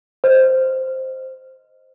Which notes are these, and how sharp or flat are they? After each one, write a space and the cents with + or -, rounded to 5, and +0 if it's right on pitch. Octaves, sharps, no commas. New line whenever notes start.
C5 +0 D#5 +0